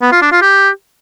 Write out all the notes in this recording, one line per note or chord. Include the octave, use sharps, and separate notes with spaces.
B3
F4
D4
F4
G4